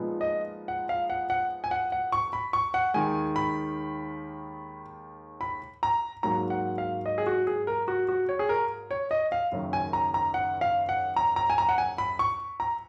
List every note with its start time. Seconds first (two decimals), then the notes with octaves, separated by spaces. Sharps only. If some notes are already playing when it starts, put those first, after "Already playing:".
Already playing: A#2 F3 G#3 B3 D#4
0.21 D#5
0.68 F#5
0.89 F5
1.10 F#5
1.30 F#5
1.64 G#5
1.71 F#5
1.92 F#5
2.12 C#6
2.33 B5
2.53 C#6
2.74 F#5
2.94 D#2 D#3 G#3 G#5
3.36 B5
5.41 B5
5.83 A#5
6.23 G#2 F#3 A#3 A#5
6.50 F#5
6.78 F5
7.06 D#5
7.18 G#4
7.27 F#4
7.47 G#4
7.67 A#4
7.88 F#4
8.09 F#4
8.29 C#5
8.39 G#4
8.49 A#4
8.91 C#5
9.11 D#5
9.32 F5
9.52 F#1 F#2 D#3
9.73 G#5
9.93 A#5
10.14 A#5
10.34 F#5
10.61 F5
10.89 F#5
11.16 A#5
11.36 A#5
11.50 G#5
11.58 A#5
11.69 F#5
11.78 G#5
11.98 B5
12.19 C#6
12.60 A#5